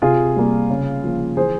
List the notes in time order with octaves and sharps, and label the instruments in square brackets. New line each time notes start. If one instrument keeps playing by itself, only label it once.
[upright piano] C3 F4 G#4
G3 A#3
C#3
F3 A#3
E3 G#4 C5